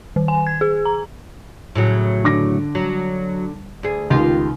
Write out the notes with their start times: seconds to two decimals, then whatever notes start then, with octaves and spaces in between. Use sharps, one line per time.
0.16 D#3
0.28 G#5
0.47 G#6
0.61 G#4
0.85 A#5
1.75 A2 C#3 F#3
2.24 D3 D6 A#6
2.75 F#3
3.83 D2 G#4
4.10 C#2 D#3 F4 G4 D#5